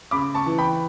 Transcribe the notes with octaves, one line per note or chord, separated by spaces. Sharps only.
C#3 B5 D6
A5 C#6
E3
G5 B5